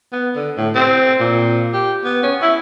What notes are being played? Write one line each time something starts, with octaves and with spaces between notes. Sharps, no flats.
B3
D3
A2
C4
A#2
G4
B3
C#4
E4